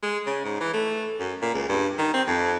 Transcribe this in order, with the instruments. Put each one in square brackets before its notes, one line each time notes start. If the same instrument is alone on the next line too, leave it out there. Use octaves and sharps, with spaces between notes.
[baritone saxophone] G#3
C#3
G#2
E3
A3
F#2
A#2
C#2
G2
D#3
C4
F2